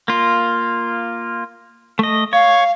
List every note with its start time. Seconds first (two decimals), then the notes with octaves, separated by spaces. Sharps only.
0.08 A#3 F4
1.99 A3 D#5
2.33 C#5 F5